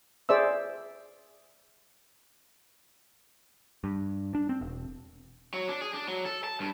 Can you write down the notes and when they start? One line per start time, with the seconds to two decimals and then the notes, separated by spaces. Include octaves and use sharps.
0.29 G#4 C5 D5 E5 E6
3.84 G2
4.35 D4
4.49 C4
4.61 E1
5.54 F#3
5.69 D4
5.82 G#4
5.94 D4
6.08 F#3
6.26 A4
6.44 A5
6.60 G2